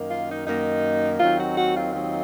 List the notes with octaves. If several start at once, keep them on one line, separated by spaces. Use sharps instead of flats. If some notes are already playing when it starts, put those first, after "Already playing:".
Already playing: F#2 D#3 A#3
F4
D#4
F#2 D#3 A#3 D#4
D#2 D#3 F#3 C4 D#4 F4
F#4
F#4
F4
D#2 D#3 F#3 C4 D#4 F4